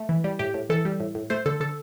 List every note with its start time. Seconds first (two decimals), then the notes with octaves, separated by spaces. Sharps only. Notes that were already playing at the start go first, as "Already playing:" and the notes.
Already playing: A3
0.09 E3
0.24 G3
0.39 A2 G4
0.54 A2
0.70 E3 A4
0.85 G3
1.00 A2
1.15 A2
1.30 A3 C5
1.46 D3 A4
1.60 D3 A4